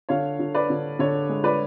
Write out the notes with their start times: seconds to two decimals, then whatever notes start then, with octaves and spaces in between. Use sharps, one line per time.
0.09 D3 C#5 F5
0.39 D3
0.54 B4 D5
0.70 D3
0.99 D3 C#5
1.29 G#3
1.44 B4 D5